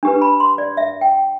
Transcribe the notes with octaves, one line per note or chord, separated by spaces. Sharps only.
D4 G4 B4
B5
C6
D5
E5
G5